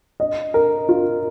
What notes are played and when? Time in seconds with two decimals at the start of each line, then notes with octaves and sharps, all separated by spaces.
0.20 D#5
0.54 A#4
0.89 F4